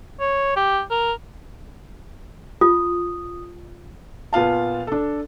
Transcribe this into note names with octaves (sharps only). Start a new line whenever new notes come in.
C#5
G4
A#4
F4 D#6
A#2 B3 F4 F5 A5
D4 A4